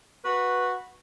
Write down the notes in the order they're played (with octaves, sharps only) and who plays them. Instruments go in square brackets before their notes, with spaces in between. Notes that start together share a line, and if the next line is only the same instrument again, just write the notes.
[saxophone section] F#4 B4